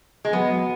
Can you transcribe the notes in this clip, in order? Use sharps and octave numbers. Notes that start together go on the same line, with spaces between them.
G#3
F#3 B3
F#3